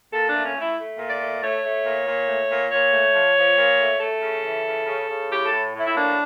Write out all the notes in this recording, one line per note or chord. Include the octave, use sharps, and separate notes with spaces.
A#2 A4
D4
A3
C#4
A3
E4
A3
A#2
D5
A3
A3 C#5
A3
A#2
A#2
A3
A#2
A#2 C#5
A3
F3
F3
A#2
A3
A3 A4
C#3
E3
C#3
C#3
C#3
A2 G4
A4
A2
A2 E4
E4
A#3 D4